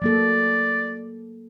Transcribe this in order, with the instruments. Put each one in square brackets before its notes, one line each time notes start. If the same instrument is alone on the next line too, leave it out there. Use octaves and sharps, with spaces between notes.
[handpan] F#3 A#3 A4 [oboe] D5